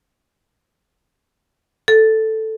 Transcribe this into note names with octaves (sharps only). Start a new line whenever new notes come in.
A4